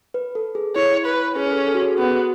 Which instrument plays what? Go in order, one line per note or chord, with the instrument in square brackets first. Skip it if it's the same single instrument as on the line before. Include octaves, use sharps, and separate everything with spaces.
[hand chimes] B4
A4
G#4
[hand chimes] E4 [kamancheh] C#5
[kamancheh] B4
[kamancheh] C#4 [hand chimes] G#4
[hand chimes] B4
A4
A4
F#4
G#4
[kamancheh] B3 [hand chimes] F#4